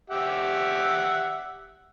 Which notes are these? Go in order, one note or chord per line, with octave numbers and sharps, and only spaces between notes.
G4 E5 F#5